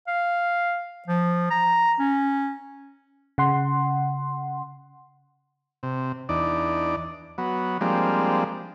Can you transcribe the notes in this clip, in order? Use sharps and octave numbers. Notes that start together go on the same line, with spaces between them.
F5
F3
A#5
C#4
C#3 F#5 C6
C3
E2 D4 D#4 D5
F#3 B3
F3 G3 G#3 A#3 C4 D4